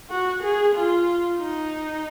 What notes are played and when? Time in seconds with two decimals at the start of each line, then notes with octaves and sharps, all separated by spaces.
0.10 F#4
0.42 G#4
0.75 F4
1.39 D#4